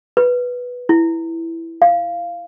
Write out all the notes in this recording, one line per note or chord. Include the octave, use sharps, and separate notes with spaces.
B4
E4
F5